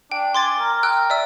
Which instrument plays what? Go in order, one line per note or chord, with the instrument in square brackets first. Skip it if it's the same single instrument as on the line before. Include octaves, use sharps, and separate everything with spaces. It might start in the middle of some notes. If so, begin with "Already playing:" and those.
[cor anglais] D4 [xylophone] G5
[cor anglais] G#5 [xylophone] C6 D6 A6
[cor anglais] A#4
[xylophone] G5 E6 F#6
D5 E5 E6